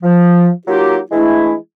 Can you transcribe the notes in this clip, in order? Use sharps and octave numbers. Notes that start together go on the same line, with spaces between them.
F3
F#3 A#3 D#4 F4 G4
E3 G#3 A3 D4 E4